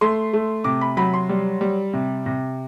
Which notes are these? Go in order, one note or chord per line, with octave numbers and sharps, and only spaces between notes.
A3 C6
A3
C3 D6
B5
F#3 B5
C6
G3
G3
C3
C3